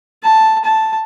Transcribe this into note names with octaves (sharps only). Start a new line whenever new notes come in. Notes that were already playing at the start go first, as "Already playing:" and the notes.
A5
A5